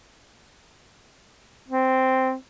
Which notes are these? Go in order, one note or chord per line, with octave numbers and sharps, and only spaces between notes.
C4